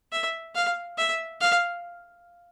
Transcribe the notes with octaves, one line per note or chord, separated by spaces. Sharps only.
E5
F5
E5
F5